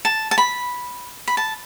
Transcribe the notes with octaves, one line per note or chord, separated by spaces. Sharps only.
A5
A5
B5
B5
A5